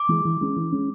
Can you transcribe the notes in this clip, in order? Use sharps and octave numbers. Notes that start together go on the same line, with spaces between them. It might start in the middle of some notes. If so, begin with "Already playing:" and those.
Already playing: D6
E3 G#3
E3
G#3 C#4
E3
G#3 C#4